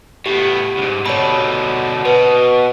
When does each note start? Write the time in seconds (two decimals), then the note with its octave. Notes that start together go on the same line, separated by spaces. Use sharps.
0.26 A2 B3 G4
0.77 C2 G#2
1.06 B2 D3 C#5 B5
2.05 B2 B4